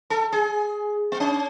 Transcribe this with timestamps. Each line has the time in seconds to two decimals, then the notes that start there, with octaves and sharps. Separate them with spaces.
0.10 A4
0.32 G#4
1.12 B3
1.20 C#4